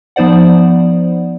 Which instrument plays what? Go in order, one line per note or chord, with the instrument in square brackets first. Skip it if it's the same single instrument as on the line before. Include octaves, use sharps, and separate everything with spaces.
[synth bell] F3 B3 D#4 C5 D5 F#5